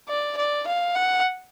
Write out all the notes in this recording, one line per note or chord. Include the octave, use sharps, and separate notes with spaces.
D5
D5
F5
F#5